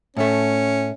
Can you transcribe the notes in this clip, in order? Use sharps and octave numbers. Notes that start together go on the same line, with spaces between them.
A2 A3 C#4